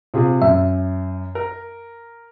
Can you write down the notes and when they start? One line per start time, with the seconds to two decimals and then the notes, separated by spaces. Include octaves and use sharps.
0.14 C3 F4 G#4
0.42 F#2 E5
1.35 A#4